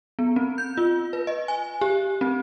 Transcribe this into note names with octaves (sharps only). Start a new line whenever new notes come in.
B3
C4
G6
F4
B4
D#5
G#5
G4
C4